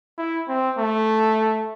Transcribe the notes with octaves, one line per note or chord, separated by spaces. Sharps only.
E4
C4
A3